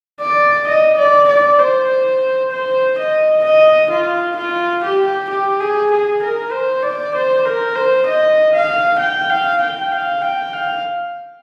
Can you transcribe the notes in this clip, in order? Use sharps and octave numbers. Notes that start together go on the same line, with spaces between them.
D5
D#5
D5
D5
C5
C5
D#5
D#5
F4
F4
G4
G4
G#4
G#4
A#4
C5
D5
C5
A#4
C5
D#5
F5
G5
F5
G5
F5
G5
F5